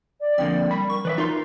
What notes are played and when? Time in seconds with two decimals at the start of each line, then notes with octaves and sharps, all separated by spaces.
0.21 D5
0.38 F2 D3 A#3 D5 G5
0.71 G3 B5
0.90 A#4 C#6
1.05 E3 B4 D5 E5
1.18 D#4 F4 A#4 C6